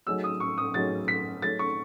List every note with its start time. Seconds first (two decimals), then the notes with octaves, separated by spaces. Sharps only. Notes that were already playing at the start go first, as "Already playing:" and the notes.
0.07 F#3 A3 D#4 G#4 C#5 E6
0.24 D#6
0.40 C#6
0.58 D#6
0.74 F#3 A3 D#4 G#4 C#5 A6
1.08 B6
1.42 F#3 A3 D#4 G#4 C#5 A6
1.59 C#6